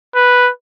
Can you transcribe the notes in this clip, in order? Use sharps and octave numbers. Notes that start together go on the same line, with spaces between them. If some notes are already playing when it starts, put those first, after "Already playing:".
B4